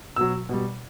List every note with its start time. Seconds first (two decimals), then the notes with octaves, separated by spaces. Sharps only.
0.16 B2 F#3 E6
0.49 B2 G3